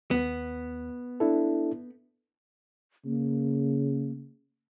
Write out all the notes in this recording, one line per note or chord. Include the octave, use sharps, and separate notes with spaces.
D#2 B3
D4 E4 A4
C#3 A#3